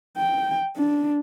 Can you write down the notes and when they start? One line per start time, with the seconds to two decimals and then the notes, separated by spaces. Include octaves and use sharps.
0.17 G5
0.77 D4